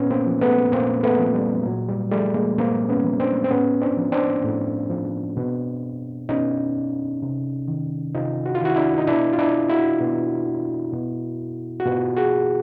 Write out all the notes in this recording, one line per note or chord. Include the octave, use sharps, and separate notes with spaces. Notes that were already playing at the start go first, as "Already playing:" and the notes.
Already playing: A#2 B3 C#4
A#3 C4
F3
A3 B3
A#2 A#3 C4
A3 B3
F3
G3
A#2 F#3
G3
F3 G3 A3
G#3 A#3
A#2 A#3 C4
B3 C#4
F3
C4 D4
C4
A2 B3 C#4
C4 D4
F3
C4 D4
A2
F3
B2
B2 C#4 D#4
C3
D#3
C3 D#4 F4
F#4
F4
D#3 E4 F#4
D4 E4
D#4
B2 D4 E4
F4
D4 E4
E4 F#4
B2
B2
F#4
B2 F4 G4
F#4 G#4